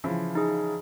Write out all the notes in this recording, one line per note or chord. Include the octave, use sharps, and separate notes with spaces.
C#3 E3 F3
D#4 G#4